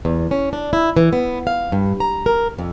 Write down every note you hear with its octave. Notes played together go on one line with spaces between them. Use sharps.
E2
C#4
D4
E4
E3
B3
F5
G2
A#5
A#4
F2